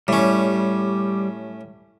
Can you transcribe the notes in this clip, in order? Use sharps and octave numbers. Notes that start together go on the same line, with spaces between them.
A2 G3 C#4